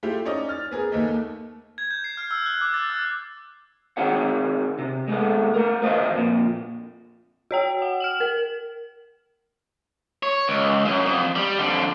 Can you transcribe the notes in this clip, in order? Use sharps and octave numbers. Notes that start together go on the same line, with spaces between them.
A3 E4 F4 G4
C#4 D#4 D5 D#5
F6 A6
B3 G#4 A#4
D#2 A3 A#3 D#4
G#6
G6
C7
F6
E6
F#6
D6
A6
E6
C4 D#4 G#4 C#5 F#5
C3
G#3 A3 B3
A3 A#4
B4 C5 D#5 F5 A5
F2 A#2
F#4 C#5 G5
F#5
F6 E7 F#7
A#4
C#5
C#2
F#2
F2
G3
F2 D3